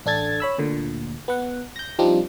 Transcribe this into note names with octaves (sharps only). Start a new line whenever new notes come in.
A1 D4 A4 G#6 A6
C#5 B5 E6
D2 A#2 D3
B3 F#5
G6 A#6
F3 G3 C4 D4 D#4 F4